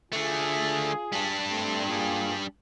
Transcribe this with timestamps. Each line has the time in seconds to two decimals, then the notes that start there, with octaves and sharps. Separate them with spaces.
0.12 D3 A3 F4 G#4
1.12 G3 D4
1.47 A3 C4
1.86 A#3 F4 G#4